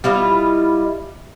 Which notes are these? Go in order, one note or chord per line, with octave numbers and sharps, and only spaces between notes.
G3 E4 F4 D#5